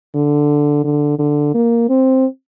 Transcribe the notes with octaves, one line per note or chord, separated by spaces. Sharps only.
D3
D3
D3
A#3
C4